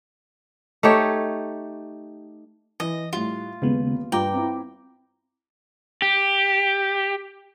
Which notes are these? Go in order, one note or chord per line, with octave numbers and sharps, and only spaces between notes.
A3 D#4 G4 C#5
E3 D#5
A2 G3 F4
D#1 C#3 G#3 B3 B4
G2 F4 G5 A#5 D6
C4 E4
G4